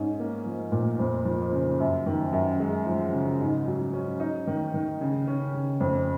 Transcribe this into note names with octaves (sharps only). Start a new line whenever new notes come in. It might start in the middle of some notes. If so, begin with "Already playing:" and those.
Already playing: G#2 C#4
A#3
F3
A#2
F2
F3
C#3
F#2
D#3
F#2
G#3
F3
C#3
G#2
F#3
C#4
D#4
D#3
D#3
C#3
C#4
C#3
F2